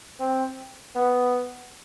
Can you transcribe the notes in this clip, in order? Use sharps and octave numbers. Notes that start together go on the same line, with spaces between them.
C4
B3